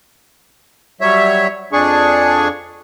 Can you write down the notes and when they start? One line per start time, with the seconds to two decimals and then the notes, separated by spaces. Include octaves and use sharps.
1.01 F#3 G3 C#5 E5
1.73 F2 D4 G#4 C#6